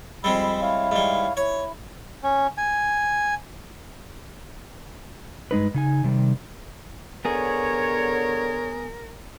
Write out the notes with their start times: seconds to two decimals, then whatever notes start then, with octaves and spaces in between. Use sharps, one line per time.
0.24 F2 G3 G#3 C4 B5 E6
0.62 E4 C#5 F5
0.91 G#2 G3
1.37 E4 C#5
2.24 C#4
2.58 G#5
5.51 G2 G#3 D#4 B4
5.74 C#3 D#4 G#5
6.04 C3 D#3 G3
7.25 D3 B3 G#4 A#4 C#5